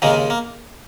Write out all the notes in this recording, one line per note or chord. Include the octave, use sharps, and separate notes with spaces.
D#2 C#3 G#3 A#3
A#3